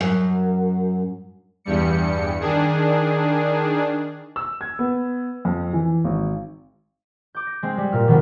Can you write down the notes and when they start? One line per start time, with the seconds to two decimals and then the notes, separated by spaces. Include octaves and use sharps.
0.01 F#2
1.64 E2 G2 G3 C#7
2.40 D#3 D4 G#4
4.36 E6
4.61 G#6
4.79 B3
5.45 F2
5.73 E3
6.04 G#1
7.35 D6 G6
7.47 A#6
7.63 G#3 C4
7.78 G3
7.92 A#2 F6
8.08 B2 D#3 F3 G3 B3